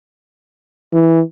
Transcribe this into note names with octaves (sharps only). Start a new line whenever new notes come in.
E3